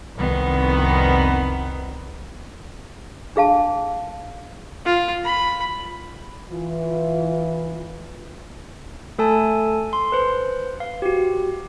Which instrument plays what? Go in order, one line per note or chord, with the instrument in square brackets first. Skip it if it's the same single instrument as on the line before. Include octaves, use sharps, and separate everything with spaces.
[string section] C2 F2 D#3 B3
[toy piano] D4 G#4 F5 A5
[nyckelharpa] F4
B5
[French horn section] E3 F4
[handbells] A3 A4 G#5 A5
C6
B4 C5
F5
F#4 G4